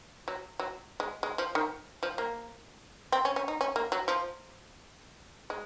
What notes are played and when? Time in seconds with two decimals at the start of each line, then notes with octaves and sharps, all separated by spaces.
0.28 F#3
0.60 F#3
1.00 G#3
1.23 G#3
1.38 F3
1.55 D#3
2.03 F3
2.18 A#3
3.12 C4
3.25 C#4
3.36 C#4
3.48 D#4
3.61 C#4
3.76 A#3
3.92 F#3
4.08 F3
5.50 G#3